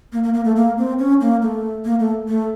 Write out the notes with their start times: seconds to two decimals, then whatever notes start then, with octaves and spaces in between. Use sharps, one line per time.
0.13 A#3
0.24 A#3
0.34 A#3
0.45 A3
0.56 A#3
0.78 C4
0.99 C#4
1.21 A#3
1.42 A3
1.85 A#3
2.00 A3
2.28 A3